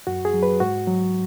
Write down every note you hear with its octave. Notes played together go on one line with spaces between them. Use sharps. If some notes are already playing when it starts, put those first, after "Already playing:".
F#2 F#4
G#4
F#3
B4
G#2 F#4
F#3